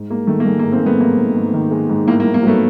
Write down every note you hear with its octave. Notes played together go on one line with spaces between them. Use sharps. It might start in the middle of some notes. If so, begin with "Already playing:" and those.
Already playing: G#2
G#3 A#3
D#3 A3
A#3
G#3 A3
A#3
G#2
A#3 C4
G#3
A3 B3
G#2 A#3
G#2
G#2
D#3
G#3
G#2
A2 A#3
A#3
A2
A#3
F#3 A3 B3